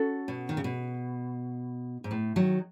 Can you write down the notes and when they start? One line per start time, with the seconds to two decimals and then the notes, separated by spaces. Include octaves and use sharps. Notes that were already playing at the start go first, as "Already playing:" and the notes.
Already playing: C#4 F#4 A4
0.28 B2
0.49 D#3
0.57 C#3
0.64 B2
2.04 G#2
2.11 A2
2.36 D#3 F#3